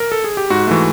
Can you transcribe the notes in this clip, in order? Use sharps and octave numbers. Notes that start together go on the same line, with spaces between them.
A#4
A4
G#4
G4
G#2 F#4
E3 A3